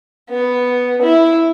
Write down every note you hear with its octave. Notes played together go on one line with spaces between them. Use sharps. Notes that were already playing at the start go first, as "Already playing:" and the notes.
B3
E4